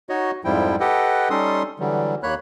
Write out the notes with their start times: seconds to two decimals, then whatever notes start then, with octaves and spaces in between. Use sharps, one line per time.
0.09 D#4 F#4 C#5 D#5
0.45 F2 G#2 F3 G3 E4 G5
0.80 G4 A4 B4 D#5 F#5 G5
1.30 G3 C#4 D#4 A4 C6 D#6
1.79 D3 E3 F#3 G3
2.23 D#2 A#3 C#5 B5 F#6